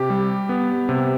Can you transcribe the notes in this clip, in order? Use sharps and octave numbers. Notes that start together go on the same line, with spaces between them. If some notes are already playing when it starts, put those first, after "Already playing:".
Already playing: C3 G4
G3
B3
C3